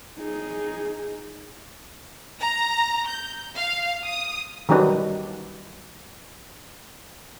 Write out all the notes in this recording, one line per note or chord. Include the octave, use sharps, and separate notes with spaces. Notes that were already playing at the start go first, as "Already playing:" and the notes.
D#4 G#4
A#5
G6
F5
D#6
D#3 F#3 G3 D4 B4